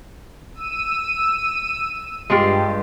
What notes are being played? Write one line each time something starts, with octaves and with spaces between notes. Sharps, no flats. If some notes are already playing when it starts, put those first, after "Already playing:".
E6 D#7
G2 G#3 F4 G4